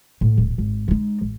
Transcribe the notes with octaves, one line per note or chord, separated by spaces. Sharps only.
A2
D1
G#1
G#3 D#4
A1